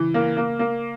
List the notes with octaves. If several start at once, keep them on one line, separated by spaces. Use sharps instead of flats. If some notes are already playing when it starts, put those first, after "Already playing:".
Already playing: C#3 E3
A#3
A#3
A#3